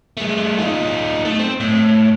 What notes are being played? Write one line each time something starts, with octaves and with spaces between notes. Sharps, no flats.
G#3 A3
D#4 F4
A3
C4
A2